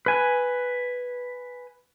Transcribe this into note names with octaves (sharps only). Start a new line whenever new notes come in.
B4 G#5